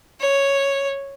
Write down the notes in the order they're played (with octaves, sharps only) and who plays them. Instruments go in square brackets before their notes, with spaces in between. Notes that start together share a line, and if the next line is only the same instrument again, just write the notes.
[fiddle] C#5